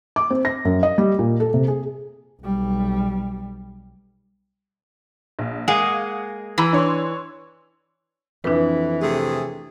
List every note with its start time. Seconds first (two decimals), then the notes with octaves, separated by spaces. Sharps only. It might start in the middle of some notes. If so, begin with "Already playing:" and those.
0.16 D6
0.30 C4
0.45 A#6
0.65 F#2
0.83 D#5
0.98 G3
1.19 A#2
1.40 A4
1.54 C3
1.68 G#4
2.42 B1 G3
5.39 A#1
5.68 G#3 A#3 G#4 F5 F#5
6.58 E3 A#5 B5 E6
6.73 D4 C#5 C6
8.44 F2 E3 D4 B4
9.01 C3 A3 G#4